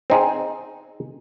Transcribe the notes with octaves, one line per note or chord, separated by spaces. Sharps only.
C4 D#4 G#4